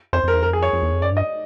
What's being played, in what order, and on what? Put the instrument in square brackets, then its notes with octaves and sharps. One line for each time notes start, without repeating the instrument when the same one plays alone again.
[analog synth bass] F2 [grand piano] C5
[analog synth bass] F2 [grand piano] A#4
[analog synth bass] E2
[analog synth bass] F2 [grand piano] A#4
[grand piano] G#4
C#5
[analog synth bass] F2
E2
F2
[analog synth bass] F#2 [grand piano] D5
[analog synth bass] G2 [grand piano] D#5